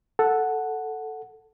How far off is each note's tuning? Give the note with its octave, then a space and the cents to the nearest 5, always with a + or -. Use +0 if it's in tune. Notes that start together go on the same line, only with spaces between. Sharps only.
A4 +0 F#5 +0